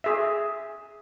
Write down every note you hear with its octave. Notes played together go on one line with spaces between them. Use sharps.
G#4 E5